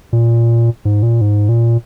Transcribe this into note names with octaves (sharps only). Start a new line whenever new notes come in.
A#2
G#2
A#2
G#2
A#2